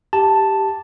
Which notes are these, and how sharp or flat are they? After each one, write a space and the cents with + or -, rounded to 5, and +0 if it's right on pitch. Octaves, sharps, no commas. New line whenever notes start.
G4 +0 A5 +0